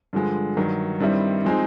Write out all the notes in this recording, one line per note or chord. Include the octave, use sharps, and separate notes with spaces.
G2 D3 F3 G#3
G2 D#3 F#3
G2 D#3 G3 C4 E4
F3 G#3 C4 D#4 G#4